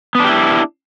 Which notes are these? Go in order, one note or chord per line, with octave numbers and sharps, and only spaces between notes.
B3 D4 E4 G4